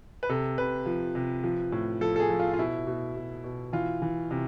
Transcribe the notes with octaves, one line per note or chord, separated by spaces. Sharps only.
B4
C3 A4
C3 B4
F3
C3
F3
A2
F3 A4
A4
G#4
F3
F4
F4
B2 E4
B2
B2
B2
E3 F4
E3
C3